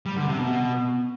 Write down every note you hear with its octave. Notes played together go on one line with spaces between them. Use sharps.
G3
D3
C3
B2